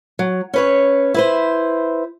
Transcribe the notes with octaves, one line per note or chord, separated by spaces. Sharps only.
F#3
C#4 B4 C#5
E4 B4 C5